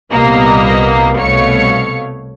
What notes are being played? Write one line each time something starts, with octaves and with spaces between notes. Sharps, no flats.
C2 A#2 G3 A#3 B3 D#5
C2 B2 A3 C#5 F5 C#7